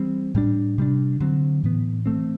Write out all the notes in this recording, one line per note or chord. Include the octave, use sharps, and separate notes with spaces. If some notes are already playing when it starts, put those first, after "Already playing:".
Already playing: E3 G3 C4
A2 G3 D4
C3 G3 D4
D3 F#3 C4
A2 E3 B3
E3 A3 C4